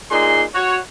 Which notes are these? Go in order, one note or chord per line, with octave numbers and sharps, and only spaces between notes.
A#2 D#4 G#4 C6
F#4 C#5